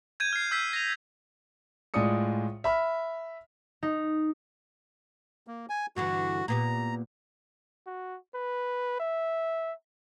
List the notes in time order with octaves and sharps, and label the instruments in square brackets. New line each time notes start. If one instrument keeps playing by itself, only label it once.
[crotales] G6 G#6 D#7
F6 C7
E6 G6 B6
A#6 F7
[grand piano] A2 G#3 F4 D5 D#6 C#7
E5 B5 F6
[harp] D#4
[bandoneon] A#3
G#5
[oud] G2 D3 E3 [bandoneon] F#4
[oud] A#2 B3 G4 [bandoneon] A#5
[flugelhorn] F#4
B4
E5